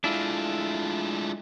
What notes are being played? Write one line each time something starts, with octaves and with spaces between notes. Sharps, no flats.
G#3 A3 D4 E4 F4